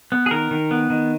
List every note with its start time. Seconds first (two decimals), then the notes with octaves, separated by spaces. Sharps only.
0.12 B3
0.26 G#4
0.31 D#3 A#4
0.51 D#3
0.71 B3
0.90 D#3